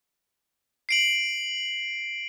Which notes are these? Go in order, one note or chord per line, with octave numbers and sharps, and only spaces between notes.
C7 D7 F#7